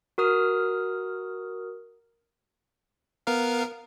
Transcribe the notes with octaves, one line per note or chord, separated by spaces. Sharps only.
F#4 A#4 D#6 F6
B3 A#4 F5